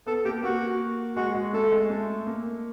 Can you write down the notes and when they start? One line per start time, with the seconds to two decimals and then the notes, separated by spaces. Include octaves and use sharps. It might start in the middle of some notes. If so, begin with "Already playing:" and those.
0.07 B3 A4
0.25 A#3 G4
0.43 A#3 F#4
1.16 G#3 F#4
1.35 G#3
1.53 A3 A4
1.71 G#3
1.90 A3
2.27 A#3